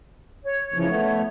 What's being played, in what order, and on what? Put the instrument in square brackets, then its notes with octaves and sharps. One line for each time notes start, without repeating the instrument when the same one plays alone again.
[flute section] C#5
[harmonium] C#3 E3 F3
A3 B3